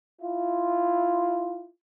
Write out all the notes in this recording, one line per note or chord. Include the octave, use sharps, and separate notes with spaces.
E4 F4